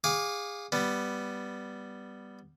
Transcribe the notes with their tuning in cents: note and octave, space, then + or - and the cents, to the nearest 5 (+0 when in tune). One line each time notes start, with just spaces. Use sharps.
G#4 -25 F5 +20 D6 -15
G3 +0 B3 +0